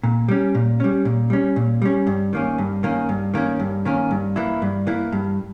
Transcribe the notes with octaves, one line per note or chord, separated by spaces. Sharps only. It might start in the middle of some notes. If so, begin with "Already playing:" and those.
A#2
G3 C#4
A#2
G3 C#4
A#2
G3 C#4
A#2
G3 C#4
G2
D#3 A#3 C#4
G2
D#3 A#3 C#4
G2
D#3 A#3 C#4
G2
D#3 A#3 C#4
G2
E3 A#3 E4
G2
E3 A#3 E4
G2